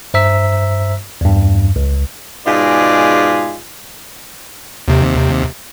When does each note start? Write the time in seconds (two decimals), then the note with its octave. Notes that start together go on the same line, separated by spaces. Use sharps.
0.14 G2 C5 E5 A#5 E6 B6
1.21 E2 G2
1.76 C#2
2.47 G#2 B2 F4 G#4 D5
4.88 D#2 C3